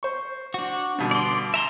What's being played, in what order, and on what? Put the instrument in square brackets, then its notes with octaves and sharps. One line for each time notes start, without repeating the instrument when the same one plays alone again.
[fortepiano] C5 C#6
[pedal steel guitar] D4 F#4
[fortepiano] G2 B2 D3
[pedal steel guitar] D5 C6
E5 A#5 C6